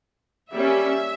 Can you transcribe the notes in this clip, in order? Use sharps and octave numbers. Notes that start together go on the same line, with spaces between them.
G3 A#3 C#4 E5